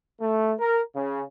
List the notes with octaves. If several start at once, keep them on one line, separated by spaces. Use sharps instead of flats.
A3
A#4
C#3